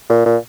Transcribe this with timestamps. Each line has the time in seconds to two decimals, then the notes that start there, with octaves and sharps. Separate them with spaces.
0.09 A#2
0.26 A#2